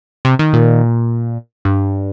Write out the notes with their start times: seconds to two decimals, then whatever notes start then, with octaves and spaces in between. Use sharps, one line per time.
0.25 C3
0.39 D#3
0.53 A#2
1.65 G2